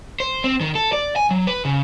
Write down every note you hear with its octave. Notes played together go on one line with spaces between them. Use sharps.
C5
C4
D#3
A4
D5
G#5
F#3
B4
C#3